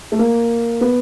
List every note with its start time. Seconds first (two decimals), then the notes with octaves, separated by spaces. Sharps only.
0.12 A3
0.19 A#3
0.81 B3